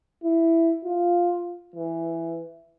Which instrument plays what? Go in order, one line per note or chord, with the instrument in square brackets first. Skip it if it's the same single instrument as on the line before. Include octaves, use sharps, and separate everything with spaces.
[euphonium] E4
F4
E3